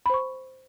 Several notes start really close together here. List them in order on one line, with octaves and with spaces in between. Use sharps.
B5 C5 C#6